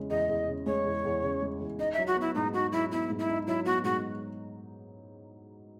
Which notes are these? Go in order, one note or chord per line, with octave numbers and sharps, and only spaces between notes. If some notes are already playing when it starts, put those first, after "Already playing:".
Already playing: E2 C#3 G#3
E2 D#5
E2
C#3
G#3 C#5
E2
E2
C#3
G#3
E2
D#4 D#5
E5
F#3
F#4
B3 E4
G#2 D#4
D#4 F#4
F#3 E4
B3 E4
G#2
E4
D#4
F#3 E4
B3 F#4
G#2 F#4